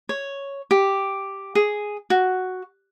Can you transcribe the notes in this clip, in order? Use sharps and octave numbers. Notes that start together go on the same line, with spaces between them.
C#5
G4
G#4
F#4